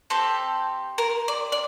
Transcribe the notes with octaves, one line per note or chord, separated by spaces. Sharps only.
C4 G4 A4
A#4
D5
D5